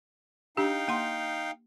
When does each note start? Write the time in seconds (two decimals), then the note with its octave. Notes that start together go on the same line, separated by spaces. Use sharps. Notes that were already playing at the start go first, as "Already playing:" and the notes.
0.57 D4 D#4 G4 F5 G5
0.88 A#3 F#5 C6